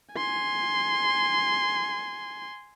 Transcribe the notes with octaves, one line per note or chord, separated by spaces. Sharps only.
G#5 C6